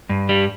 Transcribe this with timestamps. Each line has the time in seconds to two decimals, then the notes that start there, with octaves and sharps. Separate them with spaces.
0.09 G2
0.29 G3